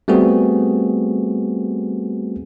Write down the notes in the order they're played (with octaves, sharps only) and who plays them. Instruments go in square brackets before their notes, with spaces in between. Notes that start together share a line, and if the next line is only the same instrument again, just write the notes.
[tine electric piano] G3 A3 B3 C4 F#4 G#4